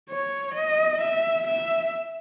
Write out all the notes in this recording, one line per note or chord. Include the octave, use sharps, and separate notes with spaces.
C#5
D#5
E5
E5